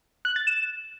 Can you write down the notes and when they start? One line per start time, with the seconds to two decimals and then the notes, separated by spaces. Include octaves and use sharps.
0.25 F#6
0.36 A6
0.47 E7